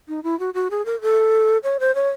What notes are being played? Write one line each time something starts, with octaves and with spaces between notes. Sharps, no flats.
D#4
E4
F#4
F#4
G#4
A#4
A4
C#5
C5
C#5